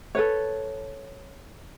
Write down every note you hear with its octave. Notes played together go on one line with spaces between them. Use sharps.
A4 B4 C#5